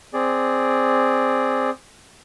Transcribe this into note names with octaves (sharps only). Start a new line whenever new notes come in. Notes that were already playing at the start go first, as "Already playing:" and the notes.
C4 G#4 D5